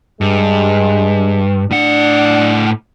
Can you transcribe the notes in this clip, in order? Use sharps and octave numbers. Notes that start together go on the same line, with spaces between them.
G2 G#3
A2 D4 F#5